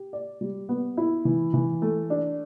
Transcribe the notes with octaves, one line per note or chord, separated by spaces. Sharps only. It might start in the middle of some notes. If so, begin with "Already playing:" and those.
Already playing: G4
D5
G3
B3
E4
E3
E3
A3
D4